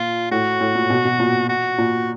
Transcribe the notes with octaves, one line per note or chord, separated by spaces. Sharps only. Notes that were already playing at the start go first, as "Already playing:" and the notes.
Already playing: A#2 F4
A2 F#4
A2
A#2
B2
B2
A#2
F#4
A#2